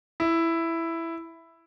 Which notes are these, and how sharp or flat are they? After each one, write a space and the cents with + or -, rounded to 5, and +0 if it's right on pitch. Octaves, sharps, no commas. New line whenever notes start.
E4 +5